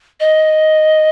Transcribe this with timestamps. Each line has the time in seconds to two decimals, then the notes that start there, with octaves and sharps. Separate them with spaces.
0.20 D#5